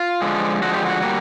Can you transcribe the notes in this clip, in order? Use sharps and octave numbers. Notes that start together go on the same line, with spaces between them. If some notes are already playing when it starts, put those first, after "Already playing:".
Already playing: F4
D3 F3 G#3
D3 F3 G#3 F#4
G4
F#4
G3 A#3